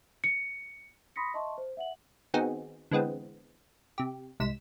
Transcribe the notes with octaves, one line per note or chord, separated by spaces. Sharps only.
C#7
B5 C6 D#6 A#6 B6 C#7
D#5 E5 A5 C6 C#6
C5
E5 F#5 F#7
D#3 B3 C4 D#4 F#4 G#4
D3 E3 G#3 B3 C4
C3 G4
C2 G#2 B6 E7